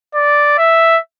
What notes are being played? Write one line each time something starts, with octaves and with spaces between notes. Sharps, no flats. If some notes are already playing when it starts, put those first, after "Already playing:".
D5
E5